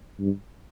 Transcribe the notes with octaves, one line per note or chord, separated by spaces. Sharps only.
G2